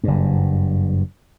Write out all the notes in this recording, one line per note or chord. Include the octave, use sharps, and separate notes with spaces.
F#1 G2